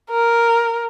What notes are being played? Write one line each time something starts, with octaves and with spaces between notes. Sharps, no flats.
A#4